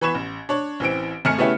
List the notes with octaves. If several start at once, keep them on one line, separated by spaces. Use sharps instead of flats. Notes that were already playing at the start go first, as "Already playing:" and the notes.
E3 B3 B5 C#6 G#6 E7
A1
D4 C#5
A1 E3 C4 D7
G#1 A3 G#5 F6 C#7
C#3 A3 B3 C#4 E4 G4